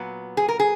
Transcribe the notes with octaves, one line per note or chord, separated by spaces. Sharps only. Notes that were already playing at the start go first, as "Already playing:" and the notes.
Already playing: A#2 F#3 B3
G#4
A#4
G#4